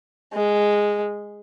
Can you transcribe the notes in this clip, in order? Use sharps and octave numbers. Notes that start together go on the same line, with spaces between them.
G#3